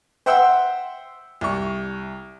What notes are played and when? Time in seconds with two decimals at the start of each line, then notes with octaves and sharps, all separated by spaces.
0.26 C5 E5 F#5 G5 C6 E6
1.41 C2 C#6